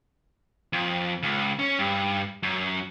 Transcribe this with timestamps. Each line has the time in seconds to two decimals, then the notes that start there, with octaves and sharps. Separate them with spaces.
0.73 F2
1.23 C#2
1.59 C#4
1.79 G2
2.43 F#2